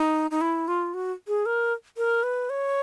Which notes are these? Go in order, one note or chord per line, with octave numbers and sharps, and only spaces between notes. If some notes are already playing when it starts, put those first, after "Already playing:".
Already playing: D#4
D#4
E4
F4
F#4
G#4
A#4
A#4
B4
C#5